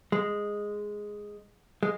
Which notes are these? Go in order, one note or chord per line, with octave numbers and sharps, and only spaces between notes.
G#3
G#3